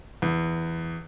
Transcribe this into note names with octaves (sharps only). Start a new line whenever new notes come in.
E2